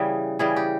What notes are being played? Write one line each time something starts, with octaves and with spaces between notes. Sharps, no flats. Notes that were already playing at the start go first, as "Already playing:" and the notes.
Already playing: C#3 E3 G3 G#4
C#3 E3 G3 G#4
G4